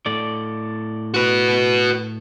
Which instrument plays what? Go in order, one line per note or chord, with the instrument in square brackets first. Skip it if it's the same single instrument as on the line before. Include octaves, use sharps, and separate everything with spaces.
[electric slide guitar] A2 A4 D5
[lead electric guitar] F#4 B4